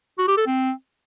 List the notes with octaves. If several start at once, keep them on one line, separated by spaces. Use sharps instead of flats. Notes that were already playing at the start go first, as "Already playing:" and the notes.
F#4
G4
A4
C4